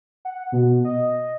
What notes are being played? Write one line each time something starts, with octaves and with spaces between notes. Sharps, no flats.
F#5
B2
D#5